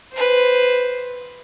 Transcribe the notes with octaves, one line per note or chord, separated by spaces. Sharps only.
B4 C5